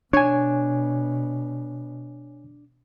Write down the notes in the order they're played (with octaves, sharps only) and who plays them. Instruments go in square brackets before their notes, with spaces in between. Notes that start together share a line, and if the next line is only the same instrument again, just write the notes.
[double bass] B2 [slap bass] D4 [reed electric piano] C#5 G#5